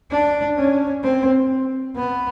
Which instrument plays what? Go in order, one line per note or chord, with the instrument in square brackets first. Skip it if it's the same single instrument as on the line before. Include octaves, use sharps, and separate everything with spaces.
[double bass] D4
C#4
C4
B3